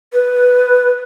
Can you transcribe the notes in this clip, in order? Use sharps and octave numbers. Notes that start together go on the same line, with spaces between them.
B4